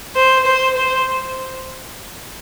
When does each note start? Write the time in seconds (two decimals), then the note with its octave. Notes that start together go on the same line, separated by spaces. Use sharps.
0.16 C5
0.46 C5
0.77 C5